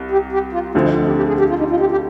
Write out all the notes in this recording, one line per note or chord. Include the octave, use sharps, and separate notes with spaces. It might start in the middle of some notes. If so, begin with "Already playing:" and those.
Already playing: C2
G4
G4
F4
D2 D3 F3 C4 F4
D#4
G4
G4
G#4
G4
F4
D#4
F4
G4
G4